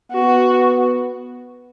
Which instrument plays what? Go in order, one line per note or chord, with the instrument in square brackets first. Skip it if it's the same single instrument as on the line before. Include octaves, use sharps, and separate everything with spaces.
[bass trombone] B3 [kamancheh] F#4